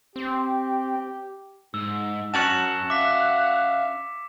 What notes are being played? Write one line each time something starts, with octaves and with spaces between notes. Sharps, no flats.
C4 G4
G#2 E6
F#2 F#3 C#4 F#4 F#5 A5 C#7 E7
E5 F5 D6 B6